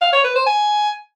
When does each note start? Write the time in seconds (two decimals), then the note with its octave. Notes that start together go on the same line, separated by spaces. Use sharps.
0.02 F5
0.13 C#5
0.24 B4
0.35 C5
0.47 G#5